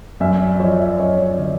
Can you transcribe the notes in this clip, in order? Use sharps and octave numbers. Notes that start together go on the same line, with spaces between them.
F#2 D5 E5
D5
D5
F3 C#5 D#5
D5 E5
F#2 C#5 D#5
C#5
D5
D3